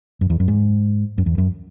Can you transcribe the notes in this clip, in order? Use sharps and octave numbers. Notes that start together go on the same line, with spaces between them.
F#2
E2
F#2
G#2
F#2
E2
F#2